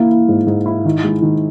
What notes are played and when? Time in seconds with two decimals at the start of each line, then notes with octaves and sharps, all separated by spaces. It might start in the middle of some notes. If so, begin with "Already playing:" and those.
Already playing: A#3 E4
0.11 E4
0.28 G#2
0.47 G#2
0.66 E4
0.85 D#3
1.04 G#3
1.22 D#3